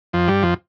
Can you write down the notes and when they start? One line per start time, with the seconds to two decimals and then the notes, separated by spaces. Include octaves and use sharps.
0.13 F2 F3
0.28 G2 G3
0.43 F2 F3